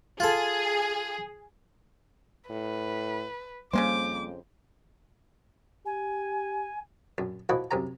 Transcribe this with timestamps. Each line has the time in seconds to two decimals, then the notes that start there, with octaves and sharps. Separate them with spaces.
0.20 F4 G#4 A4
2.50 A2 B4
3.73 F2 C#3 G3 G#3 A#3 C5 D6
5.86 G4 G#5
7.18 A#1 F#2
7.49 E3 F3 A#3 F#4 B4 D#5
7.71 C2 F#2 C3 G#5 A#5